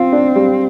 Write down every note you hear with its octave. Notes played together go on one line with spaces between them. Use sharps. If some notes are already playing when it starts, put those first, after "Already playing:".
Already playing: C4 F4
D4
G3